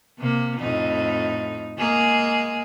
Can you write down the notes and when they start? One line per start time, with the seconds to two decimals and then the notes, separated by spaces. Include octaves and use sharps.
0.19 C3 A#3
0.60 F2 A2 D#4
1.78 G#3 A#3 G#4